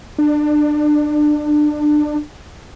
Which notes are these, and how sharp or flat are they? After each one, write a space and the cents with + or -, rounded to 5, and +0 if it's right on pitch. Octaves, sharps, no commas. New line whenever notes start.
D4 +25